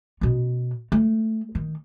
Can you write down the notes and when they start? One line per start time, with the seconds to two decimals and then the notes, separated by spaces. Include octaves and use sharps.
0.21 B2 C#4
0.92 A3
1.55 D#3